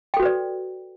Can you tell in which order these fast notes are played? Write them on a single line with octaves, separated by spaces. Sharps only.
G5 A4 F#4 B4 D5